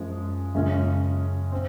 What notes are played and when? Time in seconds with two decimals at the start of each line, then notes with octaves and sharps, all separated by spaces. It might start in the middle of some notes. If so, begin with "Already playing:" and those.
Already playing: F#2 F3 G#3
0.55 F#2 C#3 G#3 C#4 F4
1.52 C4